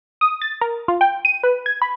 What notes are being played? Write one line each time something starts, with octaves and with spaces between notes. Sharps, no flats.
D#6
A6
A#4
F4
G5
D#7
B4
G#6
B5